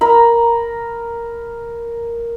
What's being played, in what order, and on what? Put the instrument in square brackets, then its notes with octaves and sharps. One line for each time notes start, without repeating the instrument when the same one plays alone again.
[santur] A#4 A#5 B5